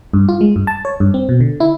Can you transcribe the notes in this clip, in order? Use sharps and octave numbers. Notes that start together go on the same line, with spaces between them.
G2
F4
G#3
G2
A5
C#5
G2
C4
B2
D3
E4